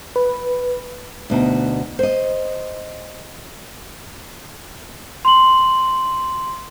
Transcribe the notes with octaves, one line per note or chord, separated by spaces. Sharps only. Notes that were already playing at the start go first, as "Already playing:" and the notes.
B4
D2 B2 D#4
C5 D#5
C6 F#7